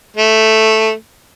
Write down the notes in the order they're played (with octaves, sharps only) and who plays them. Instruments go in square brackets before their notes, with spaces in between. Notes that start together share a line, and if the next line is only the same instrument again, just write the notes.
[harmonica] A3